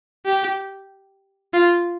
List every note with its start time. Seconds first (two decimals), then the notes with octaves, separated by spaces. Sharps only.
0.26 G4
1.53 F4